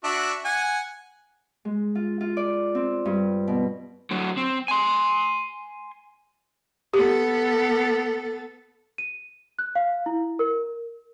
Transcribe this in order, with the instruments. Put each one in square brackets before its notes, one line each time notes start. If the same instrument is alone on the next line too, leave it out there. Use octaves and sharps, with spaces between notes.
[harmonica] D4 F#4 E5
F#5 G#5
[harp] G#3
F4
F4
D5
C4
G2
B2
[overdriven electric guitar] D3 F#3
C4
G#5 C6
[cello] B3 A4 [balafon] G4
[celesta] D#7
F#6
F5
E4
A#4